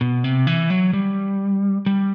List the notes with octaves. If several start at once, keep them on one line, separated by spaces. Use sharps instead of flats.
B2
C3
E3
F#3
G3
G3